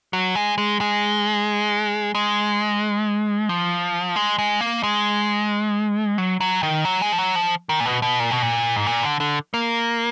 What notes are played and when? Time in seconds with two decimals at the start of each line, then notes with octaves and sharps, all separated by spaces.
0.13 F#3
0.35 G#3
0.58 G#3
0.81 G#3
2.15 G#3
3.49 F3
4.16 G#3
4.39 G#3
4.61 A#3
4.83 G#3
6.18 F#3
6.40 F#3
6.63 D#3
6.85 F#3
7.02 G#3
7.12 F3
7.18 F#3
7.36 F3
7.69 D#3
7.80 A#2
7.86 B2
8.02 B2
8.19 A#2
8.31 B2
8.42 A#2
8.76 G#2
8.86 A#2
9.03 D3
9.20 D3
9.54 A#3